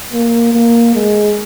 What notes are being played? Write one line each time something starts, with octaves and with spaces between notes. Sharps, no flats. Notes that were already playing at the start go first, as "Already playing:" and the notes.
A#3
A#3
G#3